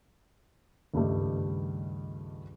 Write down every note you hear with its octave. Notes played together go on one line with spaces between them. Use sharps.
C#2 G2 D#3 G3 A3